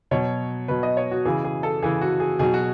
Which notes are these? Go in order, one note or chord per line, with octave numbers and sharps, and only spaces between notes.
B2 F#3 C#5
B2 F#3 B4
D#5
C#5
F#4
C#3 E3 G#4
G#4
A4
C#3 E3 G#4
F#4
G#4
B2 F#3 G#4
F#4